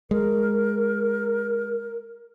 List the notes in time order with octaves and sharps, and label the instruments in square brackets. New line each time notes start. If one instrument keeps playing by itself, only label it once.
[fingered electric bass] G#3 [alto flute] A#4